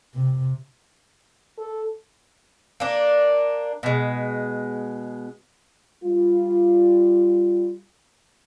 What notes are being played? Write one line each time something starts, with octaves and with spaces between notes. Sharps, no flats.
C3
A4
A#3 D4
B2 G#3
G3 F4